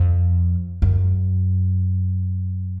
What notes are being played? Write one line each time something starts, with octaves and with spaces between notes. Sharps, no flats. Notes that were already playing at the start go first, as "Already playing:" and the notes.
Already playing: F2
F#2